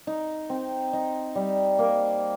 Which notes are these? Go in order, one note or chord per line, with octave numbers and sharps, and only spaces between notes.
D#4
C4
D#4
G3
A#3